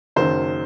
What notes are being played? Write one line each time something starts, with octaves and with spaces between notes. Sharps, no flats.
F#1 F#2 D#3 C5